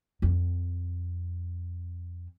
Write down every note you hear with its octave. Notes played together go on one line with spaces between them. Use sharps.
F2 C4